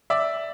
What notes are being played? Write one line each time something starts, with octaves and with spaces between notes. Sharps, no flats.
D5 E5